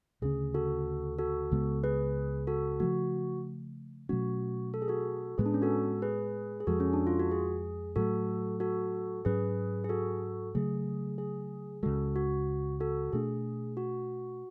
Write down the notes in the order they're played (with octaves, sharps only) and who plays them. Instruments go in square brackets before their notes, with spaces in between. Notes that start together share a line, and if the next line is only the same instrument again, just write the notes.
[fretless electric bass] D2 C#3 G#3 C#4 [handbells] G#4
[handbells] F#4 A4
F#4 A4
[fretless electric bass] C#2 C#3 G#3 B3
[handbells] G#4 B4
F#4 A4
[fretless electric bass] C#3 F3 A3 [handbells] F#4
[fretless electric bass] B2 F#3 A3 C#4 [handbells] F#4
[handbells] A4
G#4
F#4 A4
[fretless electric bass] A2 G#3 B3 [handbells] G#4 B4
[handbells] D4
C#4
F#4 A4
G#4 B4
G#4
[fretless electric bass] F2 F3 G#3 [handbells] F#4 A4
[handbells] C#4
D4
F4
F#4
G#4
[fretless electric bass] A2 F#3 A3 [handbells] F#4 A4
[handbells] F#4 A4
[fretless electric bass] G#2 F#3 C#4 [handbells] G#4 B4
[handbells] G#4
F#4 A4
[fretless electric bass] C#3 F#3 A3 [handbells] G#4
[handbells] G#4
[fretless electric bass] C#2 C#3 G#3 [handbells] F#4 A4
[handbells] F#4
F#4 A4
[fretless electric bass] B2 A3 D4 [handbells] G#4
[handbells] F#4